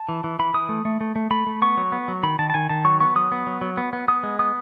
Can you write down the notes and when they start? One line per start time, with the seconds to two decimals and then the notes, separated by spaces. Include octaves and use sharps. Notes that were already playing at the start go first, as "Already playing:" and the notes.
Already playing: A5
0.09 E3
0.24 E3
0.39 E3 B5
0.54 E3 D#6
0.69 A3
0.85 A3
1.01 A3
1.16 A3
1.31 A3 B5
1.47 A3
1.62 B3 C#6
1.77 F#3
1.92 B3
2.08 F#3
2.23 D#3 B5
2.39 D#3 A5
2.50 A5
2.54 D#3 G#5
2.69 D#3 A5
2.85 F#3 C#6
3.00 B3 C#6
3.16 F#3 D#6
3.32 B3
3.47 F#3
3.61 F#3
3.77 B3
3.93 B3
4.08 B3 D#6
4.23 G#3
4.39 B3 D#6